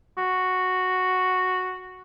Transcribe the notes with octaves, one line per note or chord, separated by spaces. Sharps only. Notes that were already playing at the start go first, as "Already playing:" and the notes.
F#4